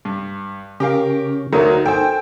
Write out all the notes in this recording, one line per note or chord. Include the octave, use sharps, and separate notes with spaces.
G2
C#3 C#4 G4 A#4 F5
D2 F#3 D#4 A#4
A4 C5 G5 G#5